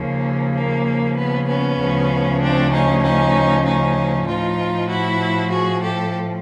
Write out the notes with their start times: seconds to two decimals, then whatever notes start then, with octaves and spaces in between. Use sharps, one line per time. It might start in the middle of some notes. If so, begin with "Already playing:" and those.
Already playing: D#2 C#3 F3 A#3
0.55 A#3
1.17 B3
1.47 B3 C#4
1.79 D2 C#3 F3
2.41 C4 D4
2.72 C#4 D#4
3.02 C#4 D#4
3.64 C#4 D#4
4.26 A2 F3 D#4 F4
4.89 E4 F#4
5.50 F#4 G#4
5.81 G4 A4